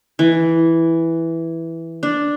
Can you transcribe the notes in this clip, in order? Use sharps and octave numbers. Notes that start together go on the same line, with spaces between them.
E3
D4